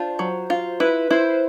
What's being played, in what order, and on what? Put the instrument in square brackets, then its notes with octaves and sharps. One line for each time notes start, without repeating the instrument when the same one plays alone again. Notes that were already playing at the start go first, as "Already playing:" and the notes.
Already playing: [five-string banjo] D4 F4 [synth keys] C5
[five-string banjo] F#3
F4
[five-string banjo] E4 [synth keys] B4
[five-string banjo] E4 [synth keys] C5